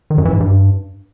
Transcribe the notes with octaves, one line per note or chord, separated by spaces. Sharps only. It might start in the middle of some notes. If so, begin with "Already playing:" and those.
D#3
F#2
E3
G#2
G2